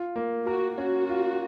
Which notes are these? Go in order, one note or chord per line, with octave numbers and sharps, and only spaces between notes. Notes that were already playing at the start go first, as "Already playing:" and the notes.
Already playing: F4
A#3
F#4 A#4
C#4 F#4
F4